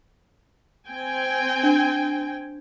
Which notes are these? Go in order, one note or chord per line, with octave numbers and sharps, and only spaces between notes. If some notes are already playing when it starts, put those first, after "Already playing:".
C4 G5 G#5
D4